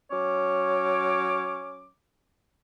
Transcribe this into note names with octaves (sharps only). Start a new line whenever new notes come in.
F#3 C#4 C#5 D6